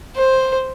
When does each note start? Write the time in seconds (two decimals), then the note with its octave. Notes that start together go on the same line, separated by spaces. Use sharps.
0.17 C5